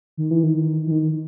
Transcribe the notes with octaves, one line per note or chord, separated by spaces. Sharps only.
D#3
E3
D#3
E3
D#3